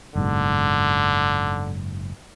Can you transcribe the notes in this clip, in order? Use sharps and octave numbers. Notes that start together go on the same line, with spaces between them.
F#1 G#2 B2 D3